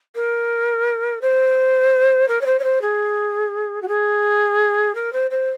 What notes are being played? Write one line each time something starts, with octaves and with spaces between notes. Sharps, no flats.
A#4
C5
A#4
C#5
C5
C#5
C5
G#4
F#4
G#4
A#4
C5
C5